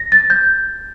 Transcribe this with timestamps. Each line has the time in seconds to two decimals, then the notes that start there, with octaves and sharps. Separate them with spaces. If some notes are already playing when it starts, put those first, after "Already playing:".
Already playing: A#6
0.12 A6
0.30 G6